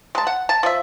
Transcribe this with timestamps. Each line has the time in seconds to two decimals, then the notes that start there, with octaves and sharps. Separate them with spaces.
0.15 G#3 A5
0.27 F#5
0.49 A5
0.63 F3 E5